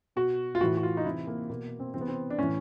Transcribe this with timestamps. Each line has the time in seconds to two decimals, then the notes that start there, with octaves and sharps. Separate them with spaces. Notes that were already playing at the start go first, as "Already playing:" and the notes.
0.16 B2 F#4
0.55 F4
0.61 A2 E3 F#4
0.77 F#4
0.83 F4
0.97 D#4
1.05 C3 E3 E4
1.27 A#3
1.50 B2 A#3
1.80 C4
1.94 C3 E3 C4
2.01 B3
2.08 C4
2.30 D4
2.38 A2 E3 C#4